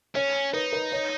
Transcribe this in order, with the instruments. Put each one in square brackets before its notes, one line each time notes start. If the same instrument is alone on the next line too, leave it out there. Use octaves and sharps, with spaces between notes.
[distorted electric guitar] C#4 [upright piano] C#5
[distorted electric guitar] D#4 [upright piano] B4
[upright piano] B4
C#5